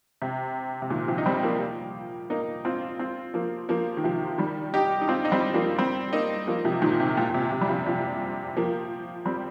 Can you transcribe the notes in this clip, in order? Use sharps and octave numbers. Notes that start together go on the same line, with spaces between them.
C3
C3
A#2 D#3
C3 F3
D#4
G3 C4
F3 A#3
A#3 D#4
C4 F4
C4 F4
F3 A#3
F3 A#3
D#3
C3 F3
D#3 G3
D#4 G4
D#4
C4 F4
D#4
G3 C4
F3 A#3
G3 C4
A#3 D#4
F3 A#3
C3 F3
A#2 D#3
C3
A#2
A#2
C3
C3
G3
C3 F3
C3 F3
F3 A#3
G3 C4